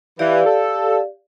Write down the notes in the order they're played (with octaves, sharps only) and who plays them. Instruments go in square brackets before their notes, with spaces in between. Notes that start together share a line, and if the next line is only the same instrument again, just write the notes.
[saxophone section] E3 [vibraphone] G4 D5 F5
[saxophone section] A4